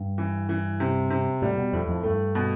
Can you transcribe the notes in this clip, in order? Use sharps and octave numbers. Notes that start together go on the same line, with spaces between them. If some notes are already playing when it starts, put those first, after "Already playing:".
Already playing: G2
E3
E3
C3
C3
A2 G3
B2
F2 A2
F2
G2 A3
B2